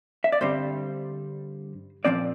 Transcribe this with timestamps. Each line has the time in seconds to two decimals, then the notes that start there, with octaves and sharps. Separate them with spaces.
0.24 E5
0.32 D5
0.41 G2 D3 G3 C4 C5
2.05 A#2 F3 C4 D5